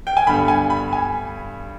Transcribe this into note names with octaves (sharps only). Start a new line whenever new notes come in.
G5
G#5
G2 D3 G3 B3 B5
G#5
B5
G#5